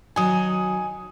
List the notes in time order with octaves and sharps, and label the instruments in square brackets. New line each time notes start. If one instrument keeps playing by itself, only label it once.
[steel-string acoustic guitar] D#3 F#3 [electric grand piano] G#5 D#6